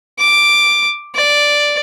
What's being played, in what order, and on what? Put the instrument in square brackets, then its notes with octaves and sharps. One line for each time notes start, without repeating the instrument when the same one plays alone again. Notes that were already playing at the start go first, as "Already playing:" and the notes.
[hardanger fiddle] D6
D5